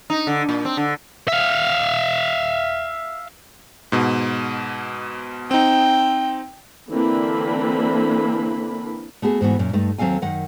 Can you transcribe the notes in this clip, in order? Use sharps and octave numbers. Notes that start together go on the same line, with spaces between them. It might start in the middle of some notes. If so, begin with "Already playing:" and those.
D#4
D3
A#2
C4
D3
E5 F5
G#2 B2
C4 D#4 G5
D3 E3 A#3 C4 D4 B5
A3 B3 F#4 G#4
G#2 E3 B3 F#4
F#2 A#2 C#4
G2 A3 D#4
D#2 F#3 C4 A4 F5 G#5
F#2 D#3 F#5